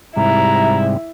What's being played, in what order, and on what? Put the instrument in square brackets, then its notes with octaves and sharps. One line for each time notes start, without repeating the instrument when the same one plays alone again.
[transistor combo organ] G#2 C3 G3 [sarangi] E4 [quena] A#5